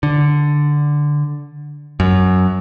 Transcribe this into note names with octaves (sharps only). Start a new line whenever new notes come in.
D3
F#2